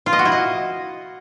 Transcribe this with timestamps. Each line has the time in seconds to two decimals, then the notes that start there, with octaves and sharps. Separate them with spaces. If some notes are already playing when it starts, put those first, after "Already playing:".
0.06 F4
0.13 D#5
0.19 F#4
0.25 E4
0.32 D#5